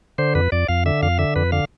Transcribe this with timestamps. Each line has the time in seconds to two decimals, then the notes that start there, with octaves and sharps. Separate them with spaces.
0.18 D3 C5
0.35 F2 B4
0.52 F2 D5
0.68 F2 F5
0.86 D3 E5
1.02 F2 F5
1.19 D3 E5
1.36 F2 B4
1.52 D3 F5